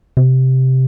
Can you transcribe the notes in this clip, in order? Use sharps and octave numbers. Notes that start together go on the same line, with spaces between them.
C3